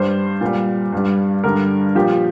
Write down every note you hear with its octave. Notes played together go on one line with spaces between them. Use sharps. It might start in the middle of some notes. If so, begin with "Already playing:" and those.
Already playing: G2 G3 C5
A#2 G3
G2 G3
G2 D3 G3 A#4
A#2 F3 G4